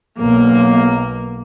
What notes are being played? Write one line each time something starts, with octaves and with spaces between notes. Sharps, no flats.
B1 A#3